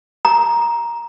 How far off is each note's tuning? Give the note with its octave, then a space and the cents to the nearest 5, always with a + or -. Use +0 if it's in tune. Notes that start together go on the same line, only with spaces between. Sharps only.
A#5 +10